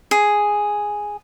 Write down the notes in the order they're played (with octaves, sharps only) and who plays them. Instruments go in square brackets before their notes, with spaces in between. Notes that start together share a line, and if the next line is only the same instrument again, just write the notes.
[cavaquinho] G#4